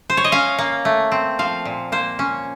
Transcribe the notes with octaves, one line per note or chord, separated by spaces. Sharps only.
C5
C#5
D#5
C#4 F5
A#3
A3
C4
F3 F5
A#2
A#3 C5
C#4